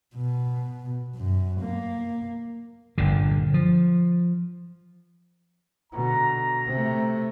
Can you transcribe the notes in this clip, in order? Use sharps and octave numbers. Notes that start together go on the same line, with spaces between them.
B2
F#2
A#3
G1 A#2 D3
F3
B2 D3 A#5
C3 A3